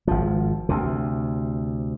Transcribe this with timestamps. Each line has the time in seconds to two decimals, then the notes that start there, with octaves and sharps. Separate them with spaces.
0.07 G#1 F3
0.69 D2 C3